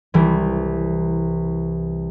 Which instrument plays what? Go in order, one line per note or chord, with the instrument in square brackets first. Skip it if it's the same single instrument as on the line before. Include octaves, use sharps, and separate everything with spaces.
[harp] C2 E3